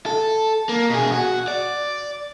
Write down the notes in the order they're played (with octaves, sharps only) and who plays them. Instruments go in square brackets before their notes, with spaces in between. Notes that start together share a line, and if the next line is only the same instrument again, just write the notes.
[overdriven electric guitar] A4
A#3
B2 G#4
F#4
D5